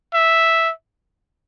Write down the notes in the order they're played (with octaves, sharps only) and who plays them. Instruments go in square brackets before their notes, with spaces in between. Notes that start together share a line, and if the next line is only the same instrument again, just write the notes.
[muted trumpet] E5